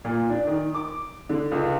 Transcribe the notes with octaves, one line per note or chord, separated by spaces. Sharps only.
A#2
D4
D#3
D6
D3
C#2